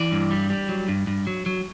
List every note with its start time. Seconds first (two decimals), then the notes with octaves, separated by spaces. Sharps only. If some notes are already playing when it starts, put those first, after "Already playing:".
Already playing: E3 D5
0.12 G2
0.31 G3
0.50 G3
0.69 F#3
0.88 G2
1.07 G2
1.27 F#3
1.46 F#3